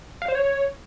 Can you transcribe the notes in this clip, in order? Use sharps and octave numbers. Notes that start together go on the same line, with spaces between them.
F5
C5
C#5